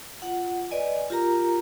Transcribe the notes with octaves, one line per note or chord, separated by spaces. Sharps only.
F4 F#5
B4 D5 D#5 G#5
F4 G4 A#4 A#5